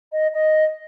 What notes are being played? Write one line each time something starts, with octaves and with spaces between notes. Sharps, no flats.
D#5
D#5